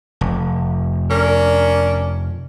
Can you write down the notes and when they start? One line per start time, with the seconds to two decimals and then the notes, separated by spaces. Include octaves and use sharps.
0.21 F1
1.10 C#4 D4 A#4